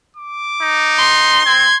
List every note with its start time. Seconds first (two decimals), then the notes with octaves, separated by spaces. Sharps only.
0.16 D6
0.61 D#4
0.98 C6
1.46 C4 G#6